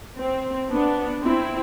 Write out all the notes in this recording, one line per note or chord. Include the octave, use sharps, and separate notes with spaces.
C4
B3 D4
C4 E4